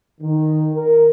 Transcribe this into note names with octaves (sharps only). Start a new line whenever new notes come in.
D#3
A#4